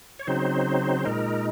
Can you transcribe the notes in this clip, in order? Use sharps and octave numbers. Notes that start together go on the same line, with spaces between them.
C#5
C#3 F#3 C4 D#4 C5
A#2 G#3 D#4 A#4